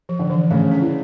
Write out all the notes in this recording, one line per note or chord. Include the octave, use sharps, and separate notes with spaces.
F3
D3
E3
C#3 A3
C#4
E3